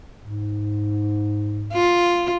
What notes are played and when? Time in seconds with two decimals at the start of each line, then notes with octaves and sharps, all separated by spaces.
0.21 G#2
1.73 F4